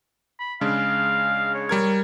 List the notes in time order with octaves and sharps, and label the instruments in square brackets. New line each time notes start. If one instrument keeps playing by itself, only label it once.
[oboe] B5
[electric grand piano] C#3 G#3 D4 [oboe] F5
[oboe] C#5
[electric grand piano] G3 A#4 G#6